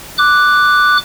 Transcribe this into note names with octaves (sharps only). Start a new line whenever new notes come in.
D6 F#6